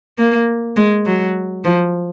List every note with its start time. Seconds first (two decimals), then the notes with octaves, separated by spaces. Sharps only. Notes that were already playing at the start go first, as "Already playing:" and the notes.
0.18 A#3
0.77 G#3
1.06 F#3
1.65 F3